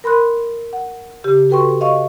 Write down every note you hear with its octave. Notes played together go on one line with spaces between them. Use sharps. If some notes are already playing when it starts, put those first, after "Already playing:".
A#4 B5 C6 F#6
F#5
C#3 G4
F#4 A4 B4 G5 C6 C#6
D#5 F5 C#6